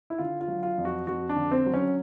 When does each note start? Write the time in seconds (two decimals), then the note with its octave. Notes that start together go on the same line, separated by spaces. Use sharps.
0.10 E4
0.18 D3 F4
0.41 F4
0.48 F#3
0.63 F4
0.78 F2
0.85 F#4
1.07 F2 F#4
1.29 D4
1.36 D3
1.51 C4
1.66 F#3
1.74 C#4